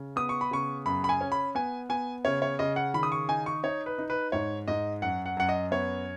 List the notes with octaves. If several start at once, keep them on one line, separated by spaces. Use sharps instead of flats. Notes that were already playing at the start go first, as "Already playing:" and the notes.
Already playing: C#3
B3 D#6
C#6
B5
C#3 C#6
F#2 B5
B5
G#5
C#4
B5
B3 G#5
B3 G#5
C#3 C#5
C#5
C#3 D#5
F#5
D#3 B5
D#6
C#6
D#4 G#5
C#6
D#4 C#5
B4
D#4
B4
G#2 C#5
G#2 D#5
F#2 F#5
F#5
F#2 F#5
D#5
B3 C#5